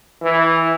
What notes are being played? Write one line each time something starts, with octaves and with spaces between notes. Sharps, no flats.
E3